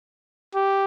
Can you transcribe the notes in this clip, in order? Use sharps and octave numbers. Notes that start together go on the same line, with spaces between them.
G4